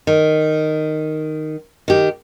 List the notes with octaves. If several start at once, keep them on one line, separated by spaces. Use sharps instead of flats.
D#3
D#3 G4